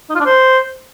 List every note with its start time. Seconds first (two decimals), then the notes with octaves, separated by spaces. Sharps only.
0.10 D#4
0.15 F4
0.20 D4
0.26 C5